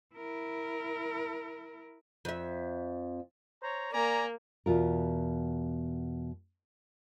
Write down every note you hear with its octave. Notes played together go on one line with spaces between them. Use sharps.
E4 A#4
F2 E5
C5 C#5 A#5
A#3 D5 G#5 A#5
E2 B2 F4 A#4